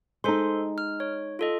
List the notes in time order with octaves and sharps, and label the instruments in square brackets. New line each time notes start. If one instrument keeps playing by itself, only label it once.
[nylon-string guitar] G#3 D#4 [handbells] A4 C5 C6
[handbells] F6
C#5
F4 A4 D#5